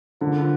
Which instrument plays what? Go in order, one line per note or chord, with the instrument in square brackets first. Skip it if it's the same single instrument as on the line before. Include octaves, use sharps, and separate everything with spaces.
[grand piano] D3 [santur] F3 A#3 F4